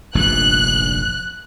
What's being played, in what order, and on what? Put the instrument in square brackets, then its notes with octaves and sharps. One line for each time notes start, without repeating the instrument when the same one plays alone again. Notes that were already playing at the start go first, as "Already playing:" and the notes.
[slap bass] F1 A#1 G2 [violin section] F#6